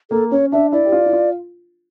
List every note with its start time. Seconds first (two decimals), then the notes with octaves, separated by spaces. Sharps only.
0.10 A#3 A4
0.31 C#4 C#5
0.52 D4 E5
0.72 E4 D5
0.85 G4
0.92 F4
1.06 E4
1.13 F4